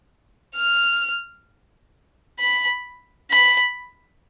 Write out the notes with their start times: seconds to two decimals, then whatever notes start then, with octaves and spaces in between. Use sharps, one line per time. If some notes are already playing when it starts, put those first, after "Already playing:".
0.56 F6
2.39 B5
3.31 B5